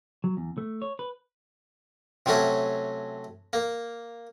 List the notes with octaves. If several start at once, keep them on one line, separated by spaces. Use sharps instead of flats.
F#3
E2
A3
C#5
B4
C3 F#3 A3 C#4 F#4
A#3